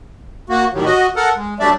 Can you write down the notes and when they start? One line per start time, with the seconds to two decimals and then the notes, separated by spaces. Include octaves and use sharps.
0.50 A#3 F#4
0.73 A2 D#3 F#3 G3
0.85 F#4 D#5
1.16 A4 A#4 F#5
1.36 G#3
1.60 F#3 G3 A3 D4 D5 E5